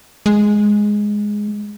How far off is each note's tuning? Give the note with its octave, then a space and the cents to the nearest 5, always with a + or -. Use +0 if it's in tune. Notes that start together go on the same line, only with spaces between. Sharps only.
G#3 +0